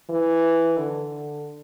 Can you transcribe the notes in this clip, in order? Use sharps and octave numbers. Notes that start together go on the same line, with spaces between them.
E3
D3